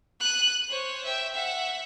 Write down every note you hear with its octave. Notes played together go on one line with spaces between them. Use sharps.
F#6 D#7
C5 C#5
E5 G5
E5 F#5